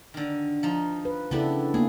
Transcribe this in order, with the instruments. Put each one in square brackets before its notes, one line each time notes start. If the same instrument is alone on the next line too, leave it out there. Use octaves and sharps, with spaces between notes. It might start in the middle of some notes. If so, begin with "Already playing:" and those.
[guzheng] D3 D#3
F3 D#4
[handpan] B4
[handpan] C#3 E4 A4 [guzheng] B3 D4 G4
[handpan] A#3 B3 [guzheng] G#4